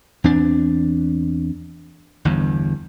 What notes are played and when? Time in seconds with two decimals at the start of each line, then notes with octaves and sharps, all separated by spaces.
0.24 E2 C4 D4
2.25 G1 E2 G2